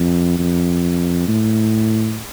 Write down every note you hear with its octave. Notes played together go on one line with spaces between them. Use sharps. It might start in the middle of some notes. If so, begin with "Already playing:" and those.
Already playing: F2
F2
A2